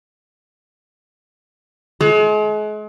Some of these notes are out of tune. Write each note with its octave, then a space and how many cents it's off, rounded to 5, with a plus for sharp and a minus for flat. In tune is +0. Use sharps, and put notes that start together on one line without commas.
G#3 +40